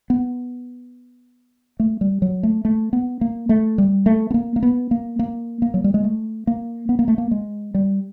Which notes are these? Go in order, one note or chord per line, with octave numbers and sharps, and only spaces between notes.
B3
A3
G3
F#3
A3
A3
B3
A#3
A3
G3
A3
B3
A#3
A#3
B3
A#3
A#3
A#3
F#3
G3
G#3
A3
A#3
B3
A#3
A3
A#3
G#3
G3